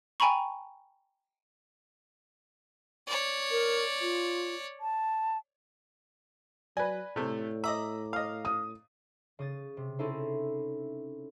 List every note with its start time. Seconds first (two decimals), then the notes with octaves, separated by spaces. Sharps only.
0.20 G5 G#5 A#5 B5 C#6
3.07 C#5 D5
3.51 A#4
4.01 F4
4.81 A5
6.77 F#3 B4 D5 G#5
7.16 A2 C3 A3
7.64 D#5 E5 A#5 D6
8.13 D#5 F5
8.45 D#6
9.39 C#3 D#6 A6
9.77 C3
9.99 C4 C#4 D#4 E4 A4 C5